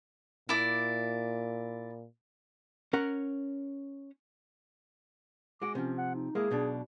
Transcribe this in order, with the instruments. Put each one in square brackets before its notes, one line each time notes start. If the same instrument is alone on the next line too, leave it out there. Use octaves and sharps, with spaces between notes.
[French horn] A#2 [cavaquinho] E4 D5
[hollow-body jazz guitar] C#4 A#4 F#5
[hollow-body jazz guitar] G#3 F#4 [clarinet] D6
[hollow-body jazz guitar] C3 F3 [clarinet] C#4
[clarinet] F#5
D#4
[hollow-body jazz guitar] G#3 A#3 E4 [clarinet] G#4
[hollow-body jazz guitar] B1 B2 D4